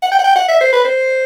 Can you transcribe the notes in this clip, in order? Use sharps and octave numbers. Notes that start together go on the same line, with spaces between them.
F#5
G5
F#5
G5
F#5
E5
C5
B4
C5